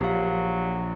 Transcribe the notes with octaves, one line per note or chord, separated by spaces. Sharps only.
A#1 F#3 G4 F5